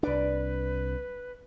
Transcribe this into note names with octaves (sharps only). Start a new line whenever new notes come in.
C2 D4 B4 D5